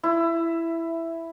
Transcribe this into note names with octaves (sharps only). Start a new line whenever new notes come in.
E4